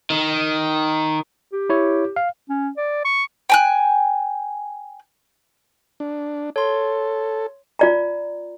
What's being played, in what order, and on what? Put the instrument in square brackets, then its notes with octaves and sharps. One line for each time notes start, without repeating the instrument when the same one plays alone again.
[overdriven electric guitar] D#3
[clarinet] G4
[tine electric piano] E4 C#5
F5
[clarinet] C#4
D5
C#6
[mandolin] G5 G#5 F#6
[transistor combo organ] D4
[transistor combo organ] A4 [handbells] C#5 C6
[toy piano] F4 D5 A#5